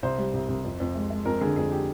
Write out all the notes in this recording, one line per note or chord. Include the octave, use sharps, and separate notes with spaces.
C2 C5
G3
C2
C2
F2
F2
G#3
G#3
F2 A#4
D3 G#4
F2 G#4
G4